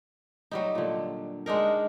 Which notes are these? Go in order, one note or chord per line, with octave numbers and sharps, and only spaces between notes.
F#3 G3 D#4
A#2 D3
G#3 D4 D#4 A#4